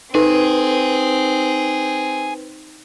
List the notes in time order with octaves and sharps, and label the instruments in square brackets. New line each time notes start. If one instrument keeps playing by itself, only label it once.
[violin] C4 [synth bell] D#4 [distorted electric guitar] G#4 [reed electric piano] B4